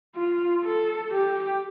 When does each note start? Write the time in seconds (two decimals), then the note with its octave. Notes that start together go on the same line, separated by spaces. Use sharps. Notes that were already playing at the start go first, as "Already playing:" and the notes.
0.16 F4
0.64 A4
1.12 G4